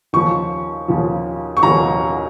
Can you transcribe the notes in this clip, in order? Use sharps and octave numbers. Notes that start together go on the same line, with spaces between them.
D#2 C#3 F3 C#6
D#2 C#3 F3
C#6
D#2 C#3 F3 A#5